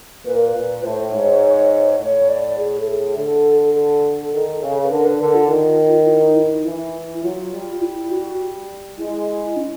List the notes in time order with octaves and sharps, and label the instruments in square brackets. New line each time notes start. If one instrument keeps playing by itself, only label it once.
[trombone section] A#2 [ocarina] B4
[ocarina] A#4
B4
[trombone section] A#2
[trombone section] A2 [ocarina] C5
[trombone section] G#2 [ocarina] C#5
[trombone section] A2 [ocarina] C#5
[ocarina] D5
G#4
A4
G#4
[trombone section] D3 [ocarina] A4
[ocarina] A4
[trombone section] D#3
C#3
[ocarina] B4
[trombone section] D3 [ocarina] A#4
[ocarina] B4
[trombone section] D3 [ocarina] A#4
[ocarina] F4
[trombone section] D#3
[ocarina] E4
D#4
E4
D#4
[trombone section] E3 [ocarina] E4
[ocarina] E4
[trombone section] F#3 [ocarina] F4
[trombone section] G3
[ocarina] E4
F#4
[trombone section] G#3 [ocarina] E4
[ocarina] C#4